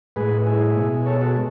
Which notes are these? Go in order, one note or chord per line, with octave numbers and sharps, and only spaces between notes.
A2 G#3 G#4 B4
E4 G#4
B2 G#3
A4 C#5
F#4 A4